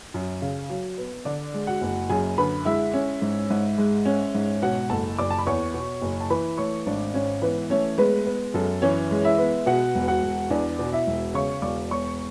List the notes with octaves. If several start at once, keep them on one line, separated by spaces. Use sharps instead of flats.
F#2
C#3
F#3
B3
D3 D4 D5
G#3
F#4 F#5
F#1
F#2 G#4 G#5
D3 B4 B5
G#3 E4 E5
C#4
G#2
G#2
G#3
C#4
G#2
B2 F#4 F#5
F#1 A4 A5
F#1 D5 D6
A5
B5
E2 C#5 C#6
B2
F#1
A5
E3 B4 B5
A3 C#5 C#6
G#1 D4 D5
G#2 C#4 C#5
E3 B3 B4
A3 C#4 C#5
G#3 B3 B4
B3
F#2 A4
E3 C#4 C#5
G#3
E4 E5
B3
B2 F#4 F#5
E1
F#4 F#5
E1
E2 D4 D5
B2
E4 E5
E1
C#3 C#5 C#6
E1 D5 D6
E1 C#5 C#6